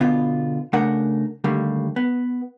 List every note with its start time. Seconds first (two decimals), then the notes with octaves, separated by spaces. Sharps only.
0.01 B2 D3 B3 F4
0.73 C#3 A3 D4 A#4 F#5
1.44 D#2 D3 G3 A3 A#3
1.96 B3